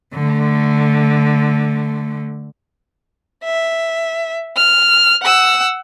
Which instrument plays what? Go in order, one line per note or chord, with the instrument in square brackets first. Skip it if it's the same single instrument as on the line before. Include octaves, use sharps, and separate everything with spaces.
[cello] D3 A3
[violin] E5
F6
F#5 E6